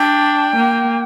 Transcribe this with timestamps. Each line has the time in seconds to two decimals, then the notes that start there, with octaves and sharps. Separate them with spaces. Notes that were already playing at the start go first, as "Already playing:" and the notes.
Already playing: D4 G5
0.56 A#3